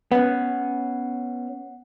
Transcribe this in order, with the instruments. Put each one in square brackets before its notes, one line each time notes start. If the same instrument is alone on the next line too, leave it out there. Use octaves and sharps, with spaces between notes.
[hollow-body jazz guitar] B3 C#4 [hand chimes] F#5